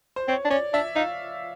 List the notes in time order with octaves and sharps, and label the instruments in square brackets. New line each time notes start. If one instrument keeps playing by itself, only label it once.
[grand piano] C5
[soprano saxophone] C4 [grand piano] C#5
[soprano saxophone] D4
[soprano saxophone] C#4 [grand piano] D5
[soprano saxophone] D4 [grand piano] E5
[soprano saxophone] D#4 [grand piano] F5